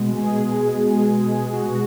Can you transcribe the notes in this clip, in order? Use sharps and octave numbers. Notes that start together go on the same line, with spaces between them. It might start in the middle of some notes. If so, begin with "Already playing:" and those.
Already playing: B2 G#3
G#4
F#4